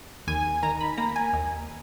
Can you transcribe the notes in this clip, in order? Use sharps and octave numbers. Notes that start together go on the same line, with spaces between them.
D#2 G#5
D#3 A#5
B5
A#3 A#5
G#5
D#2